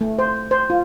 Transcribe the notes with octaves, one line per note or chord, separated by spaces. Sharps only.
A3
C5
C5
F4